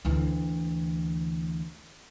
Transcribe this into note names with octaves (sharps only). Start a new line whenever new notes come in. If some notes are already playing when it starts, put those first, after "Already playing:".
D2 E3